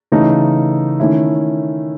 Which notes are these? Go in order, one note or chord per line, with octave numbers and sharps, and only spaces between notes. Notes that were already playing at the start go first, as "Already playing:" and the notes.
C#3 E3 A3 D#4
D#3 A3 C#4 E4